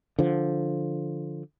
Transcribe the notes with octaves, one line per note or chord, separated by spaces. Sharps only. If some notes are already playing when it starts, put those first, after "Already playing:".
D3 F3